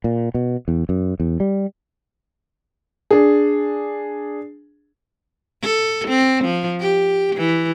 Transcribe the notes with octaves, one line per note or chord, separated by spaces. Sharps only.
A#2
B2
E2
F#2
E2
G3
D4 G#4
A4
C4
F3
G4
E3